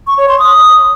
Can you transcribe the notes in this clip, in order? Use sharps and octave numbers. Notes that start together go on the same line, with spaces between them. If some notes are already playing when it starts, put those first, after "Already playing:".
C#6
C#5
C6
D#6